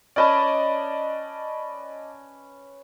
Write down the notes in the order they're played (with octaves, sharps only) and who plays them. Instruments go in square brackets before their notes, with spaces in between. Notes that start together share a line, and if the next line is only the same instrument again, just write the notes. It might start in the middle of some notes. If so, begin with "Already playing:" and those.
[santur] C#4 B4 D6 [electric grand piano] D5 D#5 A5